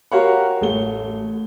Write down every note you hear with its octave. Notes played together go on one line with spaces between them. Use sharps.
F#4 G4 A#4 C#5 F5 F#5
A1 A3 G7